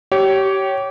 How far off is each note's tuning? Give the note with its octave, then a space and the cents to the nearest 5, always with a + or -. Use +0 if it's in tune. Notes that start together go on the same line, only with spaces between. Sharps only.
G4 -25 C#5 +0